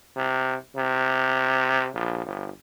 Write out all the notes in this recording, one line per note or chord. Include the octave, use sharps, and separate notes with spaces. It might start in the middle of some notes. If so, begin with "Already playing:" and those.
C3
C3
A#1
G1